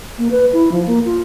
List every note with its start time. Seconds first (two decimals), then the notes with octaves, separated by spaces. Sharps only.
0.18 A#3
0.31 B4
0.53 E4
0.72 F3
0.86 A#3
1.05 F4